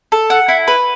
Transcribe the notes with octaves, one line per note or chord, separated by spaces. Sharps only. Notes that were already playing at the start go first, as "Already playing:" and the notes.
A4
F#5
E4
B4